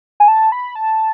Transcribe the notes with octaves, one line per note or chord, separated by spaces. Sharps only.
G#5
A5
B5
A5